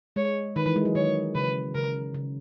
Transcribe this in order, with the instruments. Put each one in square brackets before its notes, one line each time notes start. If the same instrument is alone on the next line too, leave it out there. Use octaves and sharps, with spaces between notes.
[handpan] G#3 [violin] C#5
[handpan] D#3 [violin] B4
[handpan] E3
G#3
F#3
[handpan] D#3 [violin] C#5
[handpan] C#3 [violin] B4
[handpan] C#3 [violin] A#4
[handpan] C#3